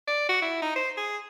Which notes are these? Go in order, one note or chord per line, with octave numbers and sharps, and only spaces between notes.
D5
F#4
E4
D#4
C5
G#4